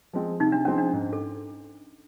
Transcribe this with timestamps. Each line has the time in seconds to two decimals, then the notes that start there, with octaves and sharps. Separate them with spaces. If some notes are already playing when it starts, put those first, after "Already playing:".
0.13 F3 G#3 C4
0.40 C3 D#4
0.52 D4
0.65 F3 G#3 C4 C#4
0.78 D4
0.93 G#2
1.13 A4